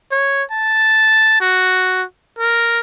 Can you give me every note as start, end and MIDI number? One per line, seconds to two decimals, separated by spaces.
0.12 0.43 73
0.52 1.39 81
1.41 2.03 66
2.39 2.80 70